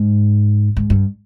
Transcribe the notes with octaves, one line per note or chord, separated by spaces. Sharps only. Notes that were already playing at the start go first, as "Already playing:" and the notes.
Already playing: G#2
G#2
G2